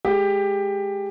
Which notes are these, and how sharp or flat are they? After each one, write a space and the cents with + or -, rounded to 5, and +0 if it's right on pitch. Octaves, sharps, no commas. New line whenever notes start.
G#3 +25 G4 +15